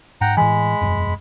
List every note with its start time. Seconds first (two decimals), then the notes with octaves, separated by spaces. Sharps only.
0.21 G#2 F#5 G5 A#5
0.37 A2 E3 G#3 G#5 B5
0.81 E1 F#2